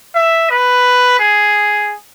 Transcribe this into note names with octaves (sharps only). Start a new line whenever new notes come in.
E5
B4
G#4